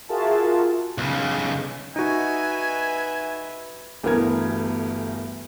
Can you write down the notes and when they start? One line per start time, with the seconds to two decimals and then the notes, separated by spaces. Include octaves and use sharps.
0.09 F4 F#4 G#4 A#4 E5 A5
0.98 B1 C#3
1.96 D#4 F#4 B4 E5 G#5
4.03 G1 D2 E3 B3 A#4 G#6